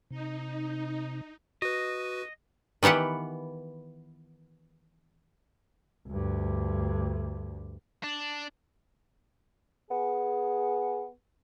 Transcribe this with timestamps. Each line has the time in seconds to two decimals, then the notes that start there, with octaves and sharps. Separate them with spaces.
0.11 C3 D#4
1.62 F#4 B4 D#5
2.83 D#3 E3 B3 G4 F#5
6.08 D2 G2
8.04 D4
9.91 B3 G#4